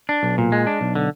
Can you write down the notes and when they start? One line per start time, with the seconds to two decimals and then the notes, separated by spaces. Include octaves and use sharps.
0.09 D4
0.23 B1
0.38 A#2
0.52 G#3
0.67 D4
0.81 B1
0.95 D3